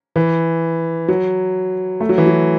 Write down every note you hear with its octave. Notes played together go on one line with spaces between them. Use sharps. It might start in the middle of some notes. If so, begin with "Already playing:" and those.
E3
F#3
A3
F#3
E3
F#3